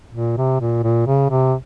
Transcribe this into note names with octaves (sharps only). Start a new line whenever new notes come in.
A#2
C3
A#2
A#2
C#3
C3